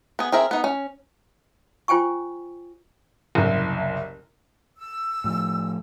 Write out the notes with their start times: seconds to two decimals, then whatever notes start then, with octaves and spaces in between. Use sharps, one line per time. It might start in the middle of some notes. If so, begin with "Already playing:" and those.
0.19 B3 G#4
0.32 C4 G#4 A#4 E5
0.51 B3 D#4
0.64 C#4
1.88 F4 C5 G5 G#5 C#6
3.35 F#1 C2
4.78 E6
5.24 A2 F3